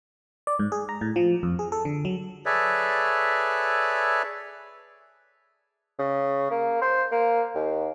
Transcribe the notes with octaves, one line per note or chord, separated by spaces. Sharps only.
D5
G#2
G#4
A#5
A2
F3
F2
G#4
A4
D3
F#3
G#4 A4 B4 C#5 D5 E5
C#3
A#3
C5
A#3
D#2